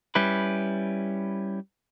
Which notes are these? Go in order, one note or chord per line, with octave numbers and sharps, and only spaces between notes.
G3 C#4 E4 B4